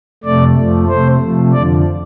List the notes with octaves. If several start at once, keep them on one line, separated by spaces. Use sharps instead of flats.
F2 C3 A3 D5
F2 F3 A3
C3 A3 C5
C3 F3 A3
F2 D3 F3 D5